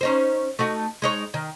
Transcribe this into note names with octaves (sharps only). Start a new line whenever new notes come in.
C#4 D#4 C5
A3 D#4 F#4
G#3 D#4 C#5
D#3